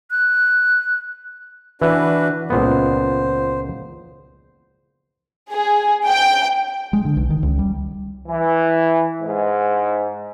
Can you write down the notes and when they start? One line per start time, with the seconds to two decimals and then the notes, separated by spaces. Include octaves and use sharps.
0.11 F#6
1.82 E3 D4 F#4 B4
2.50 C#2 A#2 B3 C5
5.50 G#4
6.08 G5
6.93 G#3
7.05 D3
7.17 B1
7.30 D#3
7.43 C#2
7.59 G3
8.28 E3
9.23 G#2